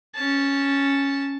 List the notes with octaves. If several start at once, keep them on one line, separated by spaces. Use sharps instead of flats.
C#4 A5